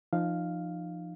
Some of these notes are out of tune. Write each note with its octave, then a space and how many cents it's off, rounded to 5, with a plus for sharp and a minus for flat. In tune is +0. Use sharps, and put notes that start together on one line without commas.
F3 -20 D#4 -30 F5 +0